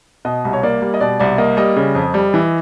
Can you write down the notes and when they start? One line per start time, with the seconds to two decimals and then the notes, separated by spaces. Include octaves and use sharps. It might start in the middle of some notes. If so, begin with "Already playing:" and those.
0.25 B2 D#5
0.45 C2
0.53 C#5
0.63 A#3 D5
0.82 G3
0.94 D#5
1.01 B2 D5
1.19 C2 D5
1.38 A#3 D#5
1.57 G3 D#5
1.76 C#3
1.95 F2
2.14 G3
2.34 E3